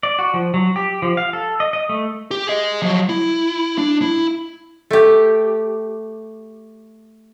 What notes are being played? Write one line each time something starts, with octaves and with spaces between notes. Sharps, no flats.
D5
F#4
F3
F#3
G4
F3
F5
A4
D#5
D#5
A3
G4
G#4 D#5
F3 F#3
E4
D4
E4
A3 G4